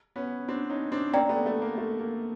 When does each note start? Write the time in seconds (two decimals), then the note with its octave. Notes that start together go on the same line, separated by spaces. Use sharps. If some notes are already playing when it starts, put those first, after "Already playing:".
0.16 B3 C#4
0.48 C4 D4
0.70 C#4 D#4
0.92 C4 D4
1.13 A#3 C4 D5 G5 A#5
1.29 A3 B3
1.46 A3
1.62 A#3
1.78 A3
2.00 A#3